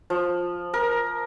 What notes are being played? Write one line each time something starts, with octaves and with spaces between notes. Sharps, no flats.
F3
A#4